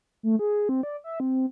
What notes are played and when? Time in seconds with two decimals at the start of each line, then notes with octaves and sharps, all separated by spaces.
0.23 A3
0.39 G#4
0.69 C4
0.83 D5
1.04 E5
1.20 C4